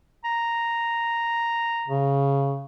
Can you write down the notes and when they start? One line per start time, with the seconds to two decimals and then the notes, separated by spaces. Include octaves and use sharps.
0.25 A#5
1.88 C#3